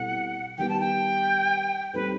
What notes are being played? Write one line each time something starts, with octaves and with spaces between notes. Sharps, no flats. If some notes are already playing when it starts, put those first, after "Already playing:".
Already playing: B2 G3 C4 E4 A4 F#5
D#3 G3 B3 G5
A5
G5
G3 C4 D#4 A4 B4 C5